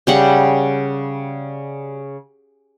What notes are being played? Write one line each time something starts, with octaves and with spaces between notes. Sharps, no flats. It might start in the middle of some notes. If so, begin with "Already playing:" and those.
C#3 G3 F#5